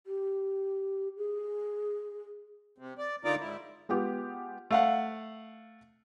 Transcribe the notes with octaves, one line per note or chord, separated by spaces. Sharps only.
G4
G#4
C3
D5
D3 D#4 F4 A#4 D5 D6
G#2 E4
G#3 B3 F4 G4
A3 F5 F#5